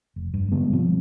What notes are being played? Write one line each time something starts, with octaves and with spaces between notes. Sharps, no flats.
F1
G2
D3 G3 G#3 B3
B2 F3 G3 C4